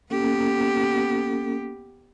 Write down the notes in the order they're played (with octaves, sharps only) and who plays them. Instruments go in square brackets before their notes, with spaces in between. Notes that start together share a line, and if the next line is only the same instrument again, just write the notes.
[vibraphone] A#3 C#4 A4 [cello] B3 G4